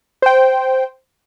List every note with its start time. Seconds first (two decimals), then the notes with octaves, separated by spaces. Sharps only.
0.22 C5 G5